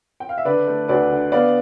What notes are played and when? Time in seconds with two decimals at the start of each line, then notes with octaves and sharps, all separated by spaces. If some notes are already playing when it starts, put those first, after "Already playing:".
0.20 G5
0.29 F5
0.38 E5
0.45 D3 B4 D5
0.67 A3
0.88 D2 B4 D5
1.11 D3
1.32 B3 D5 F5